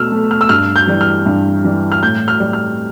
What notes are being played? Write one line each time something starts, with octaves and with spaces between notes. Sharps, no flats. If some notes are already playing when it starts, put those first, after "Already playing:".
Already playing: B2 A3 E6 F6
A3
F6
E6
G2 F6
G6
E3 G3
F6
G2
E3 G3
F6
A2 G6
F6
G3
F6